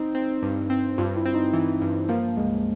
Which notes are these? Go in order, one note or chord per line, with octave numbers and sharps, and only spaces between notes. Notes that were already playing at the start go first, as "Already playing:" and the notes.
Already playing: C4 D#4
C4
G2
C4
G2 F4
E4
C4
D#4
E3
G2
F3 A#3
C#2 G#3